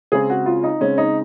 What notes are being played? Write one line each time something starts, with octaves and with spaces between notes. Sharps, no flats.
C#3 G#3 C4 G#4
F#4
F4
D#4
C#3 G#3 C4 C#4
D#4